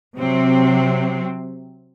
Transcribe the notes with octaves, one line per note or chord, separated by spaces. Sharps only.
C3 F#3 C4